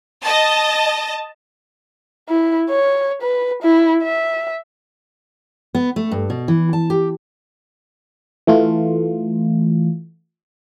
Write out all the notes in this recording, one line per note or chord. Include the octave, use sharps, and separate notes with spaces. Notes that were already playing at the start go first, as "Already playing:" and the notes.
D#5 A5
E4
C#5
B4
E4
E5
B3
A3
G2
B2
E3
A5
G4
E3 A3 F4